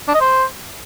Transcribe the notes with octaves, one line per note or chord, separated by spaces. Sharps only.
D4
D#5
C5